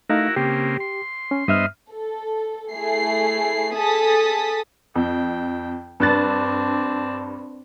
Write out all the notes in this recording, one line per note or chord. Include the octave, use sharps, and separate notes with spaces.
A3 D#4 E4 F#4 A#4 F5
C#3 A#3 C4 G4
C6
C#4
G2 B3 C5 D#5 E5 F6
A4
A3 E4 G#4 C7
G#4 A4 A5 D#6 A6 B6
F2 G5
G2 C4 D4 F#6 A6